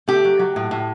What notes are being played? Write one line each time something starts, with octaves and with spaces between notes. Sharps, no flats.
A3 G4
F#3
F#3
A2
A2